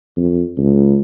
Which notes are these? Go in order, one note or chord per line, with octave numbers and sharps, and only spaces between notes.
F2
C#2